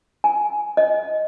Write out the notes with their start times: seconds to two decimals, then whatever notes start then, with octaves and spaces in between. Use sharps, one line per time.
0.24 G#5
0.77 D#5